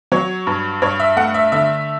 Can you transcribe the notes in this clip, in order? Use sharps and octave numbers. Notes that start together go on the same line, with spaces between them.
F#3 C#5
G2
G2 C#5
E5
A3 F#5
E5
D3 E5